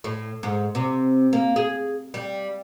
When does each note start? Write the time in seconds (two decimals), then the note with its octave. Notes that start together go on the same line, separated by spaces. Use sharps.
0.04 A2
0.43 G#2
0.75 C3
1.33 A#3
1.56 G#4
2.14 G3